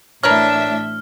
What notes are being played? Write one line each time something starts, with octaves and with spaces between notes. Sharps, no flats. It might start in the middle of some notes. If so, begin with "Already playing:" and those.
A1 A2 D4 A#4 B4 C#5 E5 F6